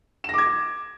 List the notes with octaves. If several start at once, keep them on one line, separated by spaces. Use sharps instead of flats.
D6 G#6 A#6 E7